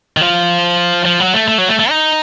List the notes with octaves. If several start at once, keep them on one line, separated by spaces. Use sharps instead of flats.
D#3
F3
F3
F#3
A3
A3
F#3
A3
A3
D#4